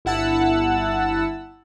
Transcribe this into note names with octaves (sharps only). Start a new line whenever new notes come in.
G1 E4 F#5 A5 E6